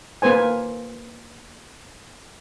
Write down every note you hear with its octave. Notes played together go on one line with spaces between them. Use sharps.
A#3 B4 C5 G#5